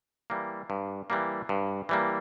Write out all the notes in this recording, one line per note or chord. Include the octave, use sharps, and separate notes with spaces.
E3 G3 A#3
G2
E3 G3 A#3
G2
E3 G3 A#3